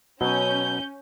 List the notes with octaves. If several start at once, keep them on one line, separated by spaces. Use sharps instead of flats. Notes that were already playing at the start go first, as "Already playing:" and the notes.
B2 F#3 C#4 G6 G7